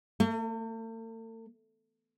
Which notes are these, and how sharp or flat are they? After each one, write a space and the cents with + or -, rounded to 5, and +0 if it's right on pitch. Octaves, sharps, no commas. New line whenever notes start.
A3 +45